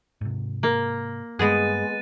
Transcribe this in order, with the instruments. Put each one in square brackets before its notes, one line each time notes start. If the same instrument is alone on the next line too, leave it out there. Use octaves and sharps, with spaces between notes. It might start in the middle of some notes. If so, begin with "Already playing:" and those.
[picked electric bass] G#2 C3
[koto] A#3
[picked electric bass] G2 [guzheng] G#3 B3 G#4 [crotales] F#6 A6 D#7